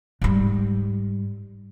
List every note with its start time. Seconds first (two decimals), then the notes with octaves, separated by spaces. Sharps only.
0.21 G#2 G3